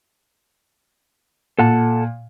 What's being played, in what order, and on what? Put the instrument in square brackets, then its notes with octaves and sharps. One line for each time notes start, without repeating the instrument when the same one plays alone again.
[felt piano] A#2 [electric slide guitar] A4 F#5 A5